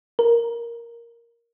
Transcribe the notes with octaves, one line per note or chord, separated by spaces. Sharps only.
A#4